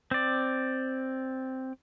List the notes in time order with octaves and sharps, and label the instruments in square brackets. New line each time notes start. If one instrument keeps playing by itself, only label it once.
[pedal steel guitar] C4 D5